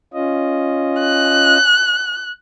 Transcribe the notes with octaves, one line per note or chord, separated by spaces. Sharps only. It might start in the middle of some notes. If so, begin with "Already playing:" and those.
C#4 F4 D#5
F#6